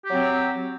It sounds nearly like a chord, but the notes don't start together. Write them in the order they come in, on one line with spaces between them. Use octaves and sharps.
G4 F#3 C4